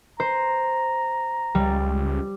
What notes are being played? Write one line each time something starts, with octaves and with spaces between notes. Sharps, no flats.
C5 A#5
C#2 G3